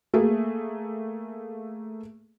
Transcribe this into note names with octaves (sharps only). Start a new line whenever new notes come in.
A3 A#3 G#4